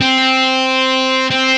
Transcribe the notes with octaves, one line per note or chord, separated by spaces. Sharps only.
C4
C4